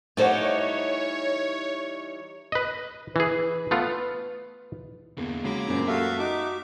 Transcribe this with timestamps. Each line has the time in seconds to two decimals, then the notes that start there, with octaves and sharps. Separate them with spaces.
0.17 E3 G3 A3 D#4 C5 C#5 F#5
2.52 B4 D#5
3.16 E3 G#4 B4
3.71 A3 B3 F4
5.18 E2 D3 A#3
5.45 C#3 F#3 G#3 A#3 A#5 B5 D6
5.68 F#2 A#2 C4 C5
5.88 A3 A#3 F#4 G4 A4 E5 F5
6.19 D#4 F#4 D6